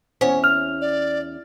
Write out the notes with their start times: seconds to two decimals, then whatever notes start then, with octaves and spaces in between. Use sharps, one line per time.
0.21 E2 C#4 C5 F#5 G#5
0.44 F6 F7
0.81 D5